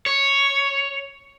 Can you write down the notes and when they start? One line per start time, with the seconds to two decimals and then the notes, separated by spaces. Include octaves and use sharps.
0.06 C#5